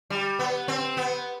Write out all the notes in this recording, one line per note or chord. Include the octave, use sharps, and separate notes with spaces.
G3
B3
C4
B3